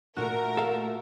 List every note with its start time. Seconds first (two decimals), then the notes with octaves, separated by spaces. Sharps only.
0.16 A#2 A3 F#4 A#4
0.57 A4 F5